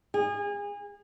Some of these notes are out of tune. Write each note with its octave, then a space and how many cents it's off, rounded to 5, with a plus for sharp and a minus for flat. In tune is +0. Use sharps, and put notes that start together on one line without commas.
G#4 -30